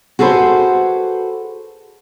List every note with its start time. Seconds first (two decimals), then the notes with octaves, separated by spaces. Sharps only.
0.19 F#4 G#4 A4 B4 C5